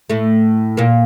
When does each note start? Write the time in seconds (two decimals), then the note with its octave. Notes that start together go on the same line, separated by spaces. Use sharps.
0.10 A2 A3
0.77 A#2 A#3